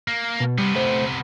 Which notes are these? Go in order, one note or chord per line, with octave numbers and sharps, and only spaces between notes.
A#3
B2
C3 G3 B3
A3 C5